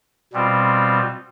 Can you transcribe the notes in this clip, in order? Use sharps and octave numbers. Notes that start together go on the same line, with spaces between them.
B2 G3 C4 F4